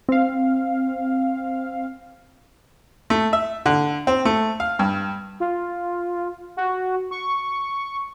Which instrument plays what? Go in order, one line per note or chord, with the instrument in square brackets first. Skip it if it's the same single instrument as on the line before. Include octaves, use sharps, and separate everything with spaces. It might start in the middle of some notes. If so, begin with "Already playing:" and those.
[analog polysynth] C4 F5
[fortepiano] A3
E5
D3
C4
A3
F5
G2
[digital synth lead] F4
F#4
C#6